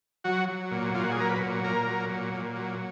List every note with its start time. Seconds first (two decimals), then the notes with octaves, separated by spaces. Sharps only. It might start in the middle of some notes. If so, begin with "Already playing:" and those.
0.24 F#3 F#4
0.48 F#3
0.71 A#2
0.94 A#2 F4
1.03 F#4
1.11 G#4
1.17 F#3 A#4
1.29 B4
1.41 A#2
1.64 A#2 A#4
1.87 F#3
2.09 A#2
2.33 A#2
2.55 F#3